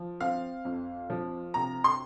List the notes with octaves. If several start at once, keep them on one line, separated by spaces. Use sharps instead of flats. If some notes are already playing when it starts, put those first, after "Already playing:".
Already playing: F3
C4 F5
F2
F3
C3 A#5
C6